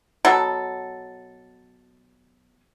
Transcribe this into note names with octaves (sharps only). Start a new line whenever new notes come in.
B2 F#3 A4